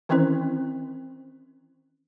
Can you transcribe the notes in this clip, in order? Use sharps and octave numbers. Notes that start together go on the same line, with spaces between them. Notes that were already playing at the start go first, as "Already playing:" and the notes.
D#3 E3 C4 C#4 E4 C5